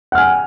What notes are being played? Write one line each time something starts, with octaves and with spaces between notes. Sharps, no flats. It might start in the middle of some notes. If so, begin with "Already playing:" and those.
F#5 G#5 F6